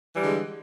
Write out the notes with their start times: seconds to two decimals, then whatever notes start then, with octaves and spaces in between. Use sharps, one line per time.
0.12 E3
0.16 G3
0.21 D3
0.25 G#3